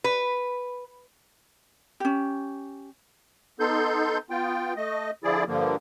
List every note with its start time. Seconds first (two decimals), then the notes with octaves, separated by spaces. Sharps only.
0.04 B4
2.00 C#4 G4
3.60 B3 D#4 A4 C6 G6
4.30 B3 F4 G5
4.76 A3 D#5
5.24 D3 F3 E4 G#4 D5
5.48 G2 D3 F3 A#3